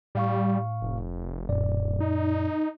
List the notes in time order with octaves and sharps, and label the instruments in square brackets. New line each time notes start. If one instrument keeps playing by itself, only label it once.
[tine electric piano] A2 F5 C#6 [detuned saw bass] G3
[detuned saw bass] F1
[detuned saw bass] D1 [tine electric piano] F#2 A#2 D5
[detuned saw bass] D#4